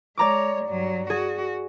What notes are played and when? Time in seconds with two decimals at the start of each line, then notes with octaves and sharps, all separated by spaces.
0.17 G#3 C#5 D5 A#5 D6
0.65 G2 F#3
1.10 F#4 G#4